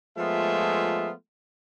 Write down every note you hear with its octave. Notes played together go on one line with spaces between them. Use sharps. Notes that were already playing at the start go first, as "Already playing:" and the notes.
F3 G#3 A3 B3 F4 E5